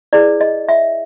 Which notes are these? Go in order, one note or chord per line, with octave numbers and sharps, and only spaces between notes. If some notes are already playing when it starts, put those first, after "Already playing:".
E4 G#4 B4 D5
D#5
E5